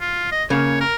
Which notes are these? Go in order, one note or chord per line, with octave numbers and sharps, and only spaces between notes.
F4
D#5
C#3 A#3 C#5
A#4